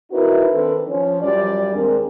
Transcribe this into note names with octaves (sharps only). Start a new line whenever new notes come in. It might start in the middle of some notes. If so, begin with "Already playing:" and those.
C4 D#4 E4 F#4 A#4 B4
D#3 C4 D4 A4 B4
F3 C#4
F#2 F3 G3 F4 D5
D#2 G#3 C4 D4 G#4 A#4